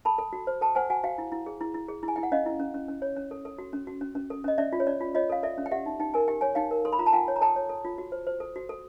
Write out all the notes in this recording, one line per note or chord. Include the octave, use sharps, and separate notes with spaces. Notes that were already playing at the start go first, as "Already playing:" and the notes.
A4 A5 B5
A4
F#4
C5
A4 G5 A5
C5 F#5 G#5
F#4 F#5 G#5
F#4 F5 G5
E4
E4
G#4
E4
E4
G#4
E4
G#5
E4 G5
F#5
C#4 D#5 F5
E4
C#4
C#4
C#4
C#5
C#4
A4
A4
F#4
C#4
F#4
C#4
C#4
A4
C#4 D#5
C#4 D5 E5
F4
C#5
C#4 D5
F4
F4 C#5 D#5
A4 F5
A4 D5 E5
C#4
G5
G4 E5 F#5
D#4
D#4 G5
A#4 G#5
G4 G5
C#5 G#5
D#4 F5 G5
A#4
A4 C6
B5
F4 A#5
A5
F4 F#5 G#5
C#5
A#5
A4 G5 A5
C#5
A4
F4
F#4
C5
C5
A4
F#4
A4